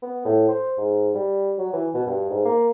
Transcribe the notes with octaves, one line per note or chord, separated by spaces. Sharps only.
B3
A2
C5
G#2
G3
F#3
E3
B2
G2
G#2
A#3